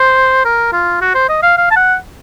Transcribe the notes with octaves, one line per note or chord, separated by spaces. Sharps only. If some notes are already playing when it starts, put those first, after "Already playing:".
Already playing: C5
A#4
F4
F#4
C5
D#5
F5
F5
A5
F#5